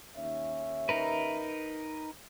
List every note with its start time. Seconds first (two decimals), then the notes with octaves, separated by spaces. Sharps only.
0.17 D#2 C#4 E5
0.89 D#4 A#4 B4